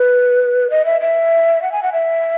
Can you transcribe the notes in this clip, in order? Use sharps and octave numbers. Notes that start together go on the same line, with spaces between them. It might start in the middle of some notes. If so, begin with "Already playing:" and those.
Already playing: B4
D#5
E5
E5
F#5
G#5
F#5
E5